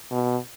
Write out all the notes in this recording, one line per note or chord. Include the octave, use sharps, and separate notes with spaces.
B2